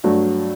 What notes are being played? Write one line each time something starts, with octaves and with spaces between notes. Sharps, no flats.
G2 F#3 A3